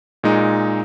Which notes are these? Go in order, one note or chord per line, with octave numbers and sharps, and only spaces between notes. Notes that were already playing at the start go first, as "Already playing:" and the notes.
A#2 G#3 D#4